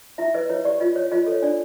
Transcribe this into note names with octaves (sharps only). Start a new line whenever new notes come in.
E4 E5
B4 D#5
E4 C#5
G4 D5
F4 D#5
C#5
F4 D#5
A4
C#5
D4 D5